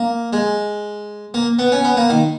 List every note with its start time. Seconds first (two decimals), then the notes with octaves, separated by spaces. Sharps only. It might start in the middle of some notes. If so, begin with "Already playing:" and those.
Already playing: A#3
0.33 G#3
1.34 A#3
1.59 B3
1.72 C#4
1.84 B3
1.97 A#3
2.10 D#3